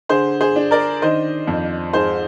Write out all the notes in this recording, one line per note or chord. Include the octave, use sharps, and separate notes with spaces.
D3 G#4 C5
G#4 C5
D4
A#4 D5
D#3 C5 D#5
F2
G#2 G#4 C5